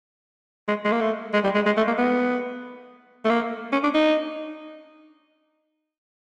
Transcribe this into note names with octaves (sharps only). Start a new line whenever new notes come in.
G#3
G#3
A#3
A3
G#3
G3
G#3
G#3
A3
A#3
B3
A3
A#3
C#4
D4
D#4